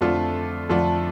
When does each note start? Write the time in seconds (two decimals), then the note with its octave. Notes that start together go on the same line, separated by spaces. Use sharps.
0.01 F2 D3 F3 A3 D4 F4 A4
0.69 F2 D3 F3 A3 D4 F4 A4